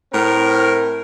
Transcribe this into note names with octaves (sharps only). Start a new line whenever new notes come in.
A2 C4 A#4